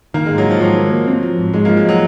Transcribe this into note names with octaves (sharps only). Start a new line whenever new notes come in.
D#3 A#3
G#2 G#3
F#3
D#3 F3
G#2 F#3
A#3
A#3
C4
F3
G#2
G#2 G#3
F3 A#3
G#3
F#3